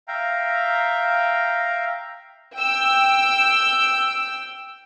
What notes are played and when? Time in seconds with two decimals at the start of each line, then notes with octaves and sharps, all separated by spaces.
0.08 E5 F5 G5 A#5
2.58 G5 E6